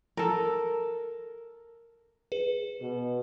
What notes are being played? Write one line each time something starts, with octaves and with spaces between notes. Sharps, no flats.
A4 A#4
G#4 B4
B2